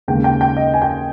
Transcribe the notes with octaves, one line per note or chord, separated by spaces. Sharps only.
D#2 C#3 G#3 G5
G5
G5
D#5
G#5
G5